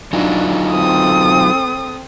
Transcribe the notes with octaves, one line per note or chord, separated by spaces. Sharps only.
F#3 D4 D#4 F4
C4 A4 D#6